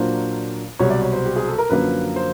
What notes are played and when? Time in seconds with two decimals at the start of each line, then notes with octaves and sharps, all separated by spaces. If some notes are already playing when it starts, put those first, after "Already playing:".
Already playing: A#2 F#3 A#3 D4 C5
0.79 C2 B2 F#3 C#5
0.90 D5
1.02 C#5
1.13 C5
1.26 G4
1.36 G#4
1.48 A4
1.58 A#4
1.70 F#2 D3 F3 A#3 B4
2.16 C5